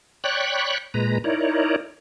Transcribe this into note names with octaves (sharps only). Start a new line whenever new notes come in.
C#5 D5 G5 B5 C#6 F#6
A#2 G#3 B4 A#5
D#4 E4 A#4 C#5 D5